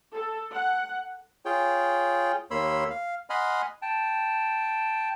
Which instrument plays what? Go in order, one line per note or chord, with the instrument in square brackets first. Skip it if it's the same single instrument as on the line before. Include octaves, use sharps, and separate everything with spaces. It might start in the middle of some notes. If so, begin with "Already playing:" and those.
[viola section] A4
F#5
[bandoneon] F4 G#4 C#5 G5
D#2 A#3 C#5 B5 C6 E6
F5
D#5 F#5 G#5 B5 C6 F6
[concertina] G5 A5